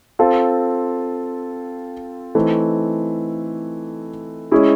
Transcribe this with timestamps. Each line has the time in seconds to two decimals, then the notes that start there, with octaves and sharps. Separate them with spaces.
0.19 C4 F4 A4
2.35 E3 A3 C4 D#4
4.52 G#3 C#4 E4 G#4